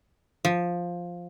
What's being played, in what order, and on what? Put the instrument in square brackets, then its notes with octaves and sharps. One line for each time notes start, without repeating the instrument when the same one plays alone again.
[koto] F3